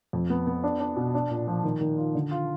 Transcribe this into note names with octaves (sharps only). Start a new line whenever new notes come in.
F2
B3
B3
D4
D4
B2
D4
A#2
F3
D#3
D#3
F4
D3
F4